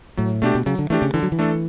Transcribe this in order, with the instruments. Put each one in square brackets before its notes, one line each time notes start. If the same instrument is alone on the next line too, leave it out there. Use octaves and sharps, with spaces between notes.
[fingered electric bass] A2 [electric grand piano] F#3
[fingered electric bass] B2 [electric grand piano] A3 D4 G4
[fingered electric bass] B2
[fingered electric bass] C#3 [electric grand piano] F#3
[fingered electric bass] D3
[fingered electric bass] E3 [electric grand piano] A3 D4 G4
[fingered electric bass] C#3
[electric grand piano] D3 [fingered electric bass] E3
[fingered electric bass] F#3
E3
[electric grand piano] A3 D4 A4